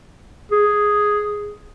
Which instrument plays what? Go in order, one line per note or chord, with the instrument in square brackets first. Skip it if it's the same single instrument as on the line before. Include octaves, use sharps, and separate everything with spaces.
[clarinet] G#4